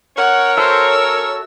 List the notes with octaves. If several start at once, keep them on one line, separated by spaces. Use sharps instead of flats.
C#4 A#4 C#5 F#5
F#4 A4 C5 E5
E6